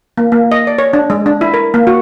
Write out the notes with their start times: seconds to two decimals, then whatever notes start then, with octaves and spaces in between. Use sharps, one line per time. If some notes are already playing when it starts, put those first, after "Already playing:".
0.18 A#3
0.32 A#3
0.52 D#5
0.67 D5
0.78 C#5
0.93 D4
1.10 G#3
1.26 D4
1.41 E4
1.54 A#4
1.74 A#3
1.87 F#4